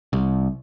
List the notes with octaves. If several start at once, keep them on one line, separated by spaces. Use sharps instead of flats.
C2